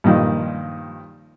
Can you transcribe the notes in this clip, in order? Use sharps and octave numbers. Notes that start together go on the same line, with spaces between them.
G2 A#2 D#3 F3